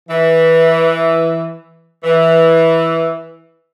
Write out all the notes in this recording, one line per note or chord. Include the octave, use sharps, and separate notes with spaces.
E3
E3